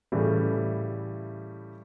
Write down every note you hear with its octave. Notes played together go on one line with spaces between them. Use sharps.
A2 C#3 E3 G3